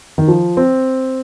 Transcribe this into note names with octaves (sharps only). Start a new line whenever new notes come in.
D#3
F3
C4